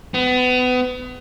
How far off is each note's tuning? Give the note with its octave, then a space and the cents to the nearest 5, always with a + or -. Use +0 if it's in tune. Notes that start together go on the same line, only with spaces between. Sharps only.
B3 +30